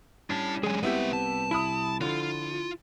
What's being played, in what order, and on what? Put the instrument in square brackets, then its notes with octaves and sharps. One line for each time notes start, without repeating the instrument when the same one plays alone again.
[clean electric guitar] G3 C#4 D4 [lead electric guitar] E4 A5
[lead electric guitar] F#3 G#3 [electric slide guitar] G#4 G#5
[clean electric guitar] C2 C3 [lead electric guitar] G#3 E5 [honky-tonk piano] B3 E4 G4 [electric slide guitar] B4
[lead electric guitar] A5
[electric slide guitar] E4 [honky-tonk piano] E5 B5 D#6
[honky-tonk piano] D3 F3 [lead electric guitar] F4